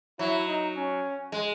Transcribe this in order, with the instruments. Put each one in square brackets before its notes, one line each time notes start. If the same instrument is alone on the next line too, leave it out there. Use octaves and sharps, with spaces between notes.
[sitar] F#3 [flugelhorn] E4
[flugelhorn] D#4
C#4
[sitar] G#3